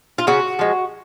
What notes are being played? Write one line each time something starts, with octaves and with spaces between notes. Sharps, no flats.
F4
C#3 F#4
F3 G#3